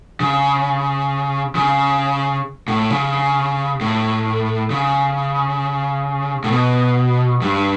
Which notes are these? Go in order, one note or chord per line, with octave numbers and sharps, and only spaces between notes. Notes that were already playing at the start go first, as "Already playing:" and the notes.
C#3
C#3
A2
C#3
A2
C#3
A2
B2
G2